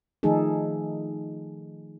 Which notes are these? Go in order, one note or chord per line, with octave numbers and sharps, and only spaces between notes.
D#3 F3 A3 D#4 G#4 A4